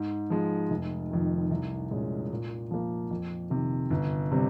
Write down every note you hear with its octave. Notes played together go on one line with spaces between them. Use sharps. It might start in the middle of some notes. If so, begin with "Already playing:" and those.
Already playing: G#2
F3 G#3
F1
F2 D#3
C2
A#2 G#3 C#4
A#2
F3 A#3
F2
C3 D#3
G1
C3 G3 C4